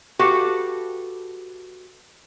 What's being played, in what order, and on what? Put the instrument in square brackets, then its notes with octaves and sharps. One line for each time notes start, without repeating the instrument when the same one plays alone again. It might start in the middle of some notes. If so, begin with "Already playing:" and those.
[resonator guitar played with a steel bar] F#4 G4 A4 B4 F5